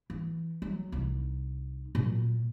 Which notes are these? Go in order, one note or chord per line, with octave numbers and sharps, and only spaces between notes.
E3
F#3
C2 D#4
A#2 F#3